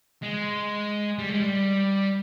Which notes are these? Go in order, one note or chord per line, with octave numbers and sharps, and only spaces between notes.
G#3
G3
G#3
G3